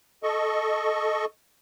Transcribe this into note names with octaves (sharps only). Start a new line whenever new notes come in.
A4 D#5 C#6